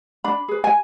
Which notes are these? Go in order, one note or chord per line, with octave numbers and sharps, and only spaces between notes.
D4 B5
G#4 B4
G#5